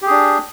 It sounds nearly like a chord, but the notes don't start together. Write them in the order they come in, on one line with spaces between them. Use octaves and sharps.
G4 G#4 D4